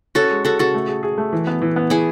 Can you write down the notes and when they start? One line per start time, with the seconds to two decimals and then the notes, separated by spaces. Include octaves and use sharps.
0.15 C#4 F#4 A4
0.31 G#3
0.45 G#3 F#4 A4
0.59 C#3 F#4 A4
0.74 A3
0.88 G#4
1.03 G#4
1.18 A3
1.33 E3
1.47 B3
1.62 E3
1.76 B3
1.90 E4 G#4